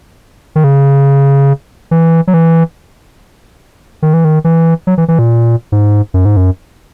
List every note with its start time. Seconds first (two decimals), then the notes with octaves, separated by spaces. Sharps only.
0.56 D#3
0.64 C#3
1.91 E3
2.27 F#3
2.34 E3
4.02 D#3
4.14 E3
4.25 D#3
4.44 E3
4.87 F#3
4.98 E3
5.08 E3
5.19 A#2
5.72 G#2
6.14 F#2
6.25 G#2
6.37 F#2